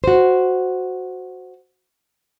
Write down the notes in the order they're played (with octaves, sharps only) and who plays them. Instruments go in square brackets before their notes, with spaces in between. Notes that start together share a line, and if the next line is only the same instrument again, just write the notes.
[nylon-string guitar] F#4 C5